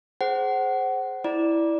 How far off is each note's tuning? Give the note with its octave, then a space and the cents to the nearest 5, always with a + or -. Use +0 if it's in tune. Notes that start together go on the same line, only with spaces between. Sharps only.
G#4 +20 C5 +0 F#5 +25
E4 +0 D5 +0 A#5 +45